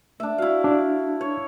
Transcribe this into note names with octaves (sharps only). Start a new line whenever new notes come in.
A3 D4 E5
E4 F#4 F5
D4
C#5